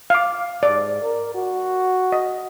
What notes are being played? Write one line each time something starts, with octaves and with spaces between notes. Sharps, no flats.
F5 D6
G#2 D5
A#4
F#4
D#5